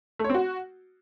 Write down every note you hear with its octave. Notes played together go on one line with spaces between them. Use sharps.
A3
C#5
C4
F#4